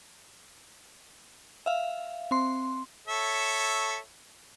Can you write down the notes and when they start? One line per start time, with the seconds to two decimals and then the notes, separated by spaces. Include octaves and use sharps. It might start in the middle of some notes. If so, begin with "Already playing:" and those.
1.66 E5 F5
2.31 C4 C6
3.07 A4 C#5 E5